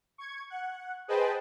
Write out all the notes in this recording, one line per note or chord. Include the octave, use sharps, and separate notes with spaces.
C#6 G#6
F#5
G#4 B4 C5 D#5 G5 A5